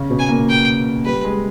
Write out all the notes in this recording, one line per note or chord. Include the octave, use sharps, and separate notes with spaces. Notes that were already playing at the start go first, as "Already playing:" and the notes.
Already playing: C#3 C#4
B2 B3
G#5
A#2 A#3
G5
G3 B4
G#3